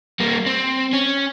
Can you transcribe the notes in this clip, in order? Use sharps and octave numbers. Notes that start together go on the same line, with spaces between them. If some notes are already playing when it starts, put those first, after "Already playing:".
G3 A#3
C4
C#4